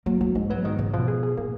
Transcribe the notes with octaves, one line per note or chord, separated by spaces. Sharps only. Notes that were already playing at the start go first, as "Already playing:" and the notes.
F#3 A#3
F#3 A#3
G#2 G#3
F#3 B3
G#2 D#3
G#2 C#3
B2 F3
G#4
G#4
A#2 A#3